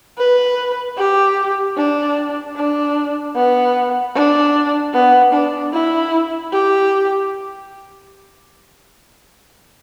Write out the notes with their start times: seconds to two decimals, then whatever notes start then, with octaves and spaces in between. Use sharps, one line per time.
0.18 B4
0.97 G4
1.77 D4
2.56 D4
3.35 B3
4.14 D4
4.93 B3
5.33 D4
5.73 E4
6.52 G4